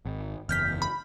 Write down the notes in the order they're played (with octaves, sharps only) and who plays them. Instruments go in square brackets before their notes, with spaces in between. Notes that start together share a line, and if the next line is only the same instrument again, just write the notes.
[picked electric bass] G#1
[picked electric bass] F#1 E2 [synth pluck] F6 G6 B6
[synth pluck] B5